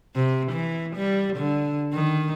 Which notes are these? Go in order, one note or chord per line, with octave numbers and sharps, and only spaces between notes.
C3
E3
G3
D3
D#3